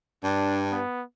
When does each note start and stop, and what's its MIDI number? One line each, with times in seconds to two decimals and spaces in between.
0.24 0.80 43
0.24 0.63 62
0.71 1.03 59